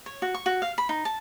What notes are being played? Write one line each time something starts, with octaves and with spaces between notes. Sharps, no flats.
C#5
F#4
C#6
F#4
F5
B5
D#4
A5